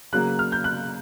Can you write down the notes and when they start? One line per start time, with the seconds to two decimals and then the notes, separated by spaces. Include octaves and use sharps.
0.12 C#3 F#3 A#3 F#6
0.39 F6
0.52 G6
0.64 F#6